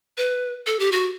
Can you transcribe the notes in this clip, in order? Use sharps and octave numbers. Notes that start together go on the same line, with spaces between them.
B4
A4
G4
F#4